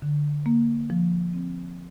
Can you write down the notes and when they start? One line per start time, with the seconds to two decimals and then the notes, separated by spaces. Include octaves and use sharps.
0.02 D3
0.46 A#3
0.90 F3
1.34 C4